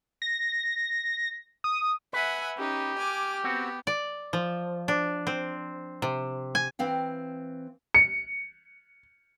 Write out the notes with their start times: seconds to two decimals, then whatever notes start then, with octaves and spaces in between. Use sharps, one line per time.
0.22 A#6
1.64 D#6
2.13 B4 E5 F#5 G#5
2.58 C#4 D#4 G4
2.98 G#5 D6 F6
3.44 B3 C4 F#4
3.87 D5
4.33 F3
4.88 D4
5.27 C4
6.02 C3
6.55 G#5
6.79 E3 C4 F5 G5
7.94 C#7